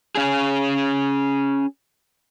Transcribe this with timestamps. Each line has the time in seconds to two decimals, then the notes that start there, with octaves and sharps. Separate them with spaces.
0.15 C#4 G#4